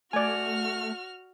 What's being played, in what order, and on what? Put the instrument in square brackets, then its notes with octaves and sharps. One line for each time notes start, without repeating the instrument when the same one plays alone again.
[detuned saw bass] A3 [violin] F#4 F6 [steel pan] D5 G#5